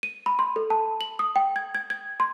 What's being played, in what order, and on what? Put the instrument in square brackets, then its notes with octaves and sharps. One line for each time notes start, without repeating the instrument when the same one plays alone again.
[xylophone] D#7
B5
C6
A4
A5
F#7
D#6
G5
G#6
G#6
G#6
C6